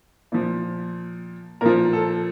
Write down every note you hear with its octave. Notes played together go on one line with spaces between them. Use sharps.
A#2 F3
A#2 F3 A#4
A4